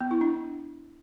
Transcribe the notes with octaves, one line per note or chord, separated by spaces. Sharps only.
B3
E4
D4